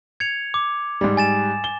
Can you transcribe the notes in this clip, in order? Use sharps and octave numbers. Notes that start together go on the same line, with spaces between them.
G#6 C#7 F7
D6
G#2 G3
G#5 A6 E7
G7